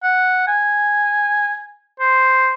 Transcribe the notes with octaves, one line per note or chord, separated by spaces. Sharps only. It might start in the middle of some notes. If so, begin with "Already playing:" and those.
F#5
G#5
C5